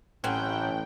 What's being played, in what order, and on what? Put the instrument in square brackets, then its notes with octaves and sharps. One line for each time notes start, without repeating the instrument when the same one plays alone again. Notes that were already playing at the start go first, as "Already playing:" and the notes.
[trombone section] A1 [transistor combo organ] A2 F#5 [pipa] F#3 C4 C#4 [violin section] G5